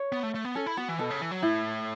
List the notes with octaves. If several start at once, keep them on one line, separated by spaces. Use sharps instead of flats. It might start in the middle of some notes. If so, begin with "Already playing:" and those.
Already playing: C#5
B3
A3
A3
B3
C#4 A4
E4
B3 F#4
E3
B2 A4
C#3
E3
F#3
A2 E4